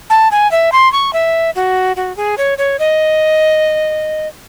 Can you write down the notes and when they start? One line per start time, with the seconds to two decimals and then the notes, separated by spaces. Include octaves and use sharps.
0.10 A5
0.31 G#5
0.51 E5
0.72 C6
0.92 C#6
1.13 E5
1.55 F#4
1.96 F#4
2.17 G#4
2.38 C#5
2.58 C#5
2.79 D#5